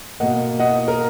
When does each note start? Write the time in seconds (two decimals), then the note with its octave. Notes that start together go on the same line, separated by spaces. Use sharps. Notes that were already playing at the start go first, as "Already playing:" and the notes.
0.20 B2 A#3 D#5 F#5
0.59 D#5 F#5
0.88 A#4